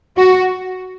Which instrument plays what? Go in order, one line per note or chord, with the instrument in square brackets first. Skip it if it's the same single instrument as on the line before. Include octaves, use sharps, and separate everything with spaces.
[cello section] F#4